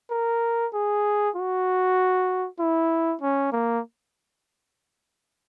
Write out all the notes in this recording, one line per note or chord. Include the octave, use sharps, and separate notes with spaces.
A#4
G#4
F#4
E4
C#4
A#3